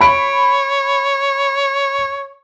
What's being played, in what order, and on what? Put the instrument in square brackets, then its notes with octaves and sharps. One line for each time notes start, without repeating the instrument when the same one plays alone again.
[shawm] C#5 [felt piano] B5 D7